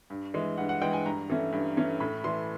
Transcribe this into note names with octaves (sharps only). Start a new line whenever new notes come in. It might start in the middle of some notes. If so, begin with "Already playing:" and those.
G2
E3 G#3
G2 F#5
F#5
E3 G#3 G5
G#5
G2 A#5
E3 A3 C#4
G2
E3 A3 C#4
A2 B5
E3 A3 C6